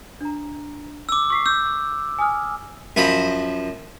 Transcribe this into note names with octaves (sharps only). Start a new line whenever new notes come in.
D4 A#5
D6 E6
C#6 B6 C7
E6 G6
G#5 D#6 F6
F#2 F3 D#5 B5